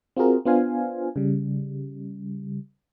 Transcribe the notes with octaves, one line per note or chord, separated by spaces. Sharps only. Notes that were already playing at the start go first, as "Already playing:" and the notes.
C4 F4 F#4 G#4 A#4
B3 D4 F4 C5 F5 G#5
C#3 G3